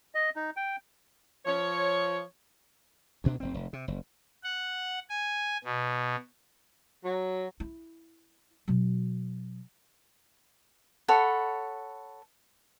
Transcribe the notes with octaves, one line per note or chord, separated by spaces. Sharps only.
D#5
D#4
G5
F3 C#5
D2 B2 D4
F1 C4
F1
C3
F#1
F#5
G#5
B2
F#3
E4
B2 F#3
A4 C#5 F#5 B5